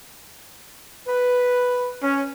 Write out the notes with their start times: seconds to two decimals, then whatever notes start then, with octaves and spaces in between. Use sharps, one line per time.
1.08 B4
2.03 C#4